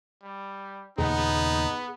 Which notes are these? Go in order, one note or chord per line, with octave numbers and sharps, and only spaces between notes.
G3
D#2 A#2 C#3 B3 D#4 G#4